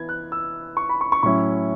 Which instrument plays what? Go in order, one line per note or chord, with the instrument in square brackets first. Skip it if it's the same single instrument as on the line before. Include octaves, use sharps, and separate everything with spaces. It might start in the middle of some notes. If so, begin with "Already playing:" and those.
Already playing: [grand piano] E3 B3 E4 G#6
F#6
E6
C#6
B5
C#6
C#6
A2 F#3 C#4 E4 C#6